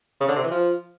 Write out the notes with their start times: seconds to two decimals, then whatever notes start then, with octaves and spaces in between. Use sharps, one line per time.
0.20 C#3
0.28 D3
0.36 C3
0.43 E3
0.51 F3